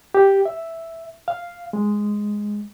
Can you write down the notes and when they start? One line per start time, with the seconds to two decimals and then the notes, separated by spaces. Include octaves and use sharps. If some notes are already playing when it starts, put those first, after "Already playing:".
0.14 G4
0.45 E5
1.28 F5
1.73 G#3